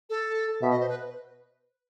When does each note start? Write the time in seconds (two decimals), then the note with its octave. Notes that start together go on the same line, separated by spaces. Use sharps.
0.10 A4
0.62 B2 E5
0.71 D#5
0.80 C5
0.89 B4